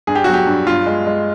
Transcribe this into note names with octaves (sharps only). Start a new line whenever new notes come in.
G2 G#4
G4
F#3 F#4
G4
G2
G2 F4
G#3
G#3